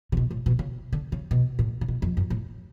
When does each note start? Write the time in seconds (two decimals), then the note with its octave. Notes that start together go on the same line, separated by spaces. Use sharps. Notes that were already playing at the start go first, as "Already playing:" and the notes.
0.12 C#3
0.17 B2
0.31 A2
0.46 B2
0.59 C#3
0.93 D3
1.12 C#3
1.31 B2
1.59 A2
1.81 C#3
1.88 B2
2.02 F2
2.17 F#2
2.30 A2